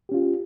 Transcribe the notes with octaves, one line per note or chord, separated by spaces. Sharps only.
C#4 F4 G4